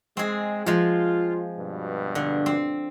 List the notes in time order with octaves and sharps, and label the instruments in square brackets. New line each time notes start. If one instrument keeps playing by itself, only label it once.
[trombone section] G#3 [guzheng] C4 G#4
[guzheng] F3 G#3 [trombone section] F4
[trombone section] G2 B2
[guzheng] D3
C4